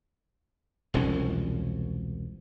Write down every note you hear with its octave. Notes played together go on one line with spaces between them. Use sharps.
E1 C2 F3 C#4